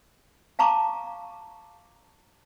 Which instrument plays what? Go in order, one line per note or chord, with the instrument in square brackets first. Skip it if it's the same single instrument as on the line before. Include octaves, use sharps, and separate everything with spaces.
[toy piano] F5 A5 A#5 C#6 D6